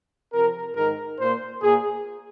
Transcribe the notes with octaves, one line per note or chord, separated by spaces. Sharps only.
C3 F3 C4 A#4
G#2 D#3 G#3 A#4
A#2 A#3 C5
A#2 A#3 G#4